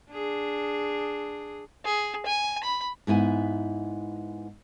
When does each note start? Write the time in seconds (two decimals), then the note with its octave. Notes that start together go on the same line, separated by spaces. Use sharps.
0.11 D4 G#4
1.85 G#4
2.26 G#5
2.63 B5
3.07 G#2 B3 E4 G#5